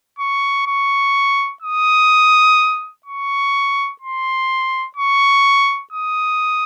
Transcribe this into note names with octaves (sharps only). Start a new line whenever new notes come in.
C#6
C#6
D#6
C#6
C6
C#6
D#6